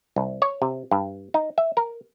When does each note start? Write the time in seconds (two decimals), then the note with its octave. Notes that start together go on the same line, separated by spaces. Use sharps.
0.16 C2
0.42 C#5
0.62 C3
0.91 G2
1.34 D#4
1.58 E5
1.77 A#4